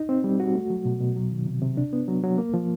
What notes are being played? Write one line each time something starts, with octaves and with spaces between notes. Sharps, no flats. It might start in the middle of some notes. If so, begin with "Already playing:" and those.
Already playing: D#4
C4
G3
F#4
A3
F#3
B2
B2
F#3
D#3
C3
C3
D4
B3
F#3
F#3
A#3
F3